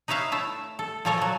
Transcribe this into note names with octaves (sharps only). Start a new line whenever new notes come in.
D#4 B4 C#5 E5 F5
A3 E4 E5
A4
A#2 F3 A4 C#5 G#5 A#5
B2 F#3